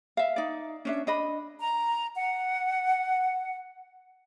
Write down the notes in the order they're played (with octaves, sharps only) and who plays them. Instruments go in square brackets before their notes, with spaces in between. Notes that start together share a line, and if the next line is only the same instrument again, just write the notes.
[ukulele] E5 F5
D#4 D5
C#4 D4 E5
D4 D#5 B5
[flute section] A#5
F#5